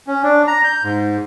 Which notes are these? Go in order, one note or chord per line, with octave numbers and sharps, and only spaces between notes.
C#4
D4
A#5
G6
G#2